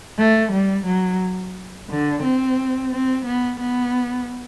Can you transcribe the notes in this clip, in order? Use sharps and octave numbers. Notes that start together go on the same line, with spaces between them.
A3
G3
F#3
D3
C4
C4
B3
B3